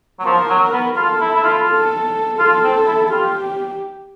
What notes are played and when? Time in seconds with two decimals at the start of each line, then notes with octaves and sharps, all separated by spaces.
0.20 F#3
0.25 F3 A#4
0.50 F#3
0.73 B3
0.96 F4 A4
1.21 E4
1.35 E4
1.44 F4
1.68 A4
2.39 F4 A4
2.63 C4
2.87 E4
3.10 F4 G4